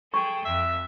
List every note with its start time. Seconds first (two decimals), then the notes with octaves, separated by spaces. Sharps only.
0.14 G#4 A4 G5 C#6
0.45 F2 E5